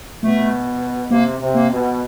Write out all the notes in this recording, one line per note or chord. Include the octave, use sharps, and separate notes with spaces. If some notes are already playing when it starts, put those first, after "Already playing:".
B2 A3
C3 A#3
C3
A#3
B2